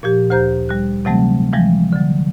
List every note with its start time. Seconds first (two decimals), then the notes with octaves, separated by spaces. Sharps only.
0.03 A#2 F3 G4
0.30 D2 G4 C5 A#5 G6
0.69 G3 F#6
1.05 C3 E3 F#3 G3 A3 C4
1.53 E3 F3 G3 G#3
1.93 D3 F#3